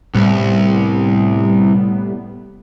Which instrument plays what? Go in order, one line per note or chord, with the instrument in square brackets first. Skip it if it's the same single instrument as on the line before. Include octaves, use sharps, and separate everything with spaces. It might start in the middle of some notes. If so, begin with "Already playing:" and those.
[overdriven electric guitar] C2 [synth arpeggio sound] A2 G3 B3